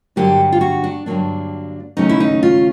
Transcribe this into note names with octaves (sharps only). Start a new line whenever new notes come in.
G2 D3 F#3 A#3 D4 G4
F4
F#4
D4
G2 D3 F#3 A#3 D4
D#2 C#3 F#3 A3 C#4 D#4
E4
D#4
F4